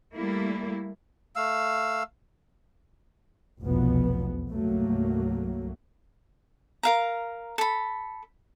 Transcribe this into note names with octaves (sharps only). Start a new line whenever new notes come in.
G3 A3 A#3 E4
A3 F5 E6
F1 B1 E2 B2 F3 B3
C2 G2 F#3 A3 A#3
A#4 F5 A#5
A4 B5